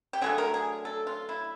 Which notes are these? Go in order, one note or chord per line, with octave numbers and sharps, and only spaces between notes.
G4
D3 F#3 A3 G#4
A#4
G#4
A4
F4
E4